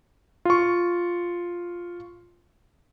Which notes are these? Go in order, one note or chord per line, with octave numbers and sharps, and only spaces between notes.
F4 C#6